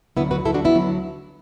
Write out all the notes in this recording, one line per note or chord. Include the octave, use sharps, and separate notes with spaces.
D2 D3 F#3 B3 E4
F#4 B4
D2 D3 F#3 E4 A4
D4 F#4
B3 E4
D2 D3 F#3